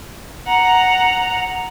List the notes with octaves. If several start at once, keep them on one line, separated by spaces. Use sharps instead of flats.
F#5 A#5